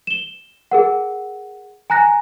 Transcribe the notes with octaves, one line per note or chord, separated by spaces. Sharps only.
E7 G7
G#4 A#4 F#5
G#5 A#5 F#6 A#6